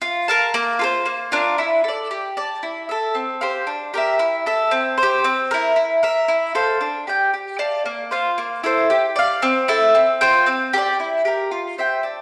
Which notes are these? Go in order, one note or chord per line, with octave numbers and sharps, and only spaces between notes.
F4
A#4 F5 A5
A#3
F4 A4 C5
A#3
D4 F4 A#4
E4
A4 D5
G4
D5 A5
E4
A4 E5
C4
G4 C5 F5
D4
G4 A#4 E5
E4
A4 E5
C4
C5
G4
C4
E4 A#4
E4
A#4 E5
E4
A4 C5 F5
D4
G4 D5 G5
G4
D5 F5 A5
A#3
F4 C5 F5
A#3
E4 A4 C5
G4
D5 F5
C4
E4 A4
C4
F4 C5 G5
C4
G4 A#4 D5
E4
G4 A#4
F4
C5 E5 G5
D4